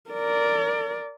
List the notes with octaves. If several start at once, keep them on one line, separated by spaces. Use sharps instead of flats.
A#4 D5